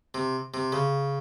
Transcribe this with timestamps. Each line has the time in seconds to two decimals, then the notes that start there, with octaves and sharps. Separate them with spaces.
0.14 C3
0.54 C3
0.72 C#3